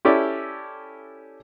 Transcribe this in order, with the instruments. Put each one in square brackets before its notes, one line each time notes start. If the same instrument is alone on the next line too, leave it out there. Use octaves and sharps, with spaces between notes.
[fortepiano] C#4 E4 G4 A4 D5 E5